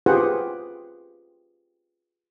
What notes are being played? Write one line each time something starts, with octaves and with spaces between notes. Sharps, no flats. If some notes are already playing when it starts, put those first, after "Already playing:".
F4 G4 G#4 B4 C5 F#5